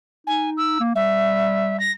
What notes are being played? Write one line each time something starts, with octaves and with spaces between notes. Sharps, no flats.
D#4 G#5
E6
A#3
G3 E5
A#6